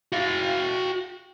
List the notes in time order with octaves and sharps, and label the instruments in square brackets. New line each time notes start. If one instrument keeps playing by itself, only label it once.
[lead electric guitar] F#4 F5